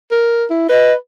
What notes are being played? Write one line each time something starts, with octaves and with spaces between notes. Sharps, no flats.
A#4
E4
B4 D#5